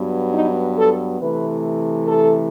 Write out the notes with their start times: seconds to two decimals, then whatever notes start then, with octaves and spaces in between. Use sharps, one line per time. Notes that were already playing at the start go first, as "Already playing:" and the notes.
Already playing: G2 F#3 B3
0.32 D#4
0.76 A4
1.20 C3 E3 A3 B4
2.07 A4